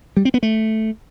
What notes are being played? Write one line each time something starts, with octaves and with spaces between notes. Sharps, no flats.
G3
C4
B3
A3